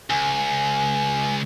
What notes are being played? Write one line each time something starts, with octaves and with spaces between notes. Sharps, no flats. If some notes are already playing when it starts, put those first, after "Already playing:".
C#2 G#5